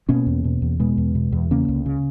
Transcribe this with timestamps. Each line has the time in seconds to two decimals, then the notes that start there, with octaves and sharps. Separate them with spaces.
0.09 B2 A#3 C#4
0.27 E2
0.44 B2
0.62 E2
0.80 B2 G#3 B3
0.98 E2
1.15 B2
1.32 E2
1.51 C#3 A#3 C#4
1.69 C#2
1.86 C#3